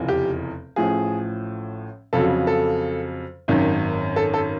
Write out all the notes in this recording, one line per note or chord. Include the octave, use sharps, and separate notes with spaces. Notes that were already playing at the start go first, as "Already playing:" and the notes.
Already playing: F1 E2 C#3 F3
G4
A1 A2 F3 G#4
F2 C#3 F#3 A4
A4
G#1 F#2 D#3
A4
A4